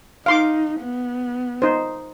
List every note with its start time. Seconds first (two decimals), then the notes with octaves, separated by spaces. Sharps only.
0.26 D#4 F5 C6 D6
0.80 B3
1.62 D#4 C5